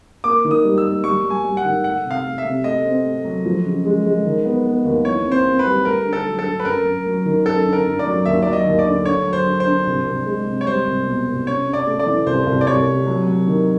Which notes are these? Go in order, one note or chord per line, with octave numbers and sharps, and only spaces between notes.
A#3 D6
D#3
D#6
G3
E6
A#3
G3 C#6
G3
G#5
G3
F#5
D#3
A3 F#5
C3
F5
A3
E5
C3
A3 D#5
C4
A3
F#3
F3
C#3
G#3
G#3
D#3
B3
B3
D#2
E3 C#5
C4
C5
C4
B4
G3
A3 A#4
D3
A4
F#3
A4
D3
B4
F#2 A#4
F#2
F#3
D#3
F#2 A4
D3
A#4
F#2
D5
F#3
D#2 E5
F#3 D5
D#5
D#2
D5
D3
D3 C#5
F#3
C5
D4
C5
D4
C2
C2
G#3
C3
C#5
G3 C5
C2
B2
C2
C#4 C#5
C#4
D5
A3
D5
E3
C2 C5
C2
D5
C2 C#5
C3
F#3
F#3
D#3